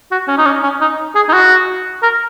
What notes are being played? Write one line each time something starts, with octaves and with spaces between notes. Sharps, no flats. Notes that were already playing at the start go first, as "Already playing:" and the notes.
F#4
C#4
D#4
C#4
C#4
D#4
G#4
D#4
F#4
A#4